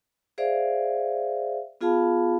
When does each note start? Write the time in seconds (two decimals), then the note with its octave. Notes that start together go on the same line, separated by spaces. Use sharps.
0.38 G#4 C5 D5 E5 F5
1.81 B3 F4 G#4 F5 A5 B5